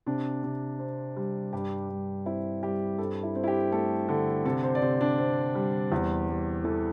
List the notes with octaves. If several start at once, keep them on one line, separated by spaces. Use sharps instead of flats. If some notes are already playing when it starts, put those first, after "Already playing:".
C3 D4
C3
C4
G3
G2 G4
G2
C4 E4
G3 G4
G2 A4
E4
C4
E4
G4
A3 A4
D3
C3 A4
C5
D5
C3 C5
D4
C4
G3
E2
G3
E3 A4